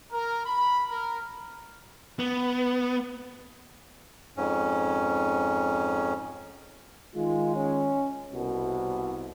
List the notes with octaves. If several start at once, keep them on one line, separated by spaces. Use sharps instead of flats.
A#4
B5
A#4
B3
F2 G#2 C#4
D#3 G#3 F4
C#4
C2 B2